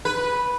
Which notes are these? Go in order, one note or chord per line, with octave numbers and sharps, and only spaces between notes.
B4